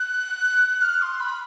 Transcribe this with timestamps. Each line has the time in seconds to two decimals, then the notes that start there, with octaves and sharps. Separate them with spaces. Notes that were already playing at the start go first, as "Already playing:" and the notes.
Already playing: F#6
0.82 F6
1.02 C6
1.20 B5